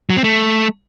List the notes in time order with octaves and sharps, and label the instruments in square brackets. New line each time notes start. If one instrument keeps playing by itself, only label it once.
[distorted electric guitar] F#3
C4
A3